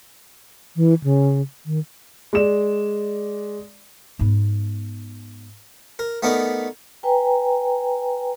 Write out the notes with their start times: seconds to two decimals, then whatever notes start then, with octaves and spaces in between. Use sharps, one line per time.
0.76 E3
1.04 C#3
1.66 D#3
2.33 G#3 D5 E7
4.19 G#2 B3
5.99 A#4
6.23 A3 B3 D#4 A#4 D5
7.03 B4 G5 G#5 A#5